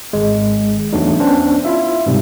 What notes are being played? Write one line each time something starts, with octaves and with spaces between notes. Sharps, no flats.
G#1 G#3
E2 F#3 A3 D4 D#4
B3 C#4 D4 C5
E4 F4 E5
G#2 C3 G3